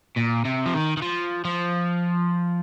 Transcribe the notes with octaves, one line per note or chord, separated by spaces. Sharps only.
A#2
C3
F3
D#3
D#3
F3
F3